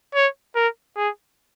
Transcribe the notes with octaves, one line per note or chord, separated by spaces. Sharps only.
C#5
A#4
G#4